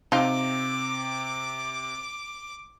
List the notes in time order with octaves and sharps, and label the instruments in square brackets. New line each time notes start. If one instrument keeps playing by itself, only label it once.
[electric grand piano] C3 C4 [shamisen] D#4 F4 [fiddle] D6